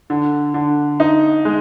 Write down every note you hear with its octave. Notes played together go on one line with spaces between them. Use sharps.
D3
D3
D#4
G#3